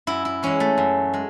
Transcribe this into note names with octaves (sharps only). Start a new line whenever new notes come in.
F#2 E4
E4
E3 G#3 C#4
A3
F#2
G#3